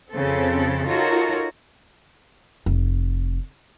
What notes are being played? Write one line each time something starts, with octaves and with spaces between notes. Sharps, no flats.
F2 C#3 C4 A4
D#4 F4 F#4 A4 A#4 C#5
F1